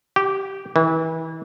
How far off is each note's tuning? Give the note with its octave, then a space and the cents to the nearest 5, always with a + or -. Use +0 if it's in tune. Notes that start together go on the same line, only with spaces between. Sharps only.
G4 -10
E3 -30